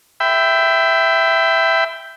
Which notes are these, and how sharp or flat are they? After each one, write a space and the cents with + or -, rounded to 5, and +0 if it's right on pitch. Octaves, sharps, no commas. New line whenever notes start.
E5 +0 G5 +0 B5 +30